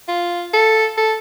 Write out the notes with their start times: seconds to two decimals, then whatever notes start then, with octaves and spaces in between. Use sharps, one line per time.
0.08 F4
0.54 A4
0.98 A4